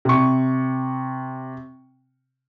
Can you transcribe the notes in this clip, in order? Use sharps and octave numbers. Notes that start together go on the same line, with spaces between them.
C3 C#6